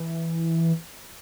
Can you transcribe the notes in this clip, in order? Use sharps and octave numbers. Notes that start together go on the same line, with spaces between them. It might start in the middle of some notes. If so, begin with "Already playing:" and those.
Already playing: E3